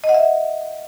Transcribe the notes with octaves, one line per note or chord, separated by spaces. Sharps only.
D#5
F#5
E5